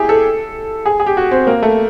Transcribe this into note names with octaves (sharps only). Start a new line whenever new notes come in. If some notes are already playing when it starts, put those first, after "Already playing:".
Already playing: E4 G4 G#4
A4
G#4
G#4
G4
F#4
C4
A#3
A3